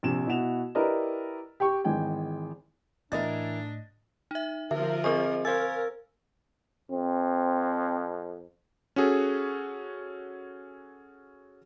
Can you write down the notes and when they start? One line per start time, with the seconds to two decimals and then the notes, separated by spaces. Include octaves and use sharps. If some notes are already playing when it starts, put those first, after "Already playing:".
0.03 A#1 C3 E7
0.27 B2 E4 F#4 E7 F7
0.75 E4 G4 A#4 B4 D5 D#5
1.60 G4 G5 C#6
1.84 G#1 E3 G#3 G5 G#5
3.12 A2 E3 D4 E4 A#4 D#5 A6
4.31 D#4 E5
4.71 D3 F3 A#4 E5
5.04 C4 G#4 C5 D#5 C#6
5.45 A#4 C5 F5 G#5 E6 G#6 A6
6.92 F2 C4
8.96 C#4 F#4 G#4 A4